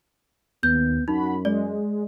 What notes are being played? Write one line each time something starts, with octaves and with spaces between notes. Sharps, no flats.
D#2 B3 G6
F#2 D#4 F#4 B5
G#3 D5